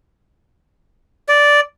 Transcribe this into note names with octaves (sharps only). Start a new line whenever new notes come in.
D5